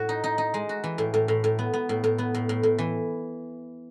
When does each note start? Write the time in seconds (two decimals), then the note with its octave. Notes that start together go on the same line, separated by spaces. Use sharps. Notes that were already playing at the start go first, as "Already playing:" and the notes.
Already playing: A2 F#4
0.09 D#4
0.24 D#4
0.38 D#4
0.54 G#3
0.69 F#4
0.84 E3
0.98 A2
1.14 A2
1.28 A2
1.44 A2
1.59 B3
1.74 B3
1.89 A2
2.04 A2
2.18 B3
2.34 A2
2.49 A2
2.63 A2
2.79 E3